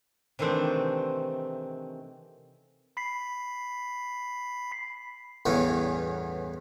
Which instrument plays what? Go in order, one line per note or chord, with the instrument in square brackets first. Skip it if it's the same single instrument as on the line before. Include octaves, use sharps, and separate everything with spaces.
[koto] C3 D#3 E3 A3 C4 D4
[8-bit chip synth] B5 B6 C7
[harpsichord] A1 E2 G2 B3 C#4